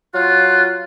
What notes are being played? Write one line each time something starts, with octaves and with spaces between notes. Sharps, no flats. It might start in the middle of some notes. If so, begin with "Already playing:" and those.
F#3 F4 F#6